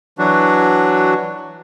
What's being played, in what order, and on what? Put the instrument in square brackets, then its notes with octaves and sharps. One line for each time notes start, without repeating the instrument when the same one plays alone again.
[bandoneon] E3 F#3 D4 F#4